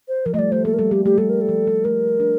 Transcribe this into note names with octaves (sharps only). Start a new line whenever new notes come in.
C5
F3 A#4
A3 D#5
G3 D5
A3 C5
A#3 A4
A#4
G3 A4
G3 G4
A3 G4
G3 A4
A#4
A4
F3
G3
A3 A#4
D4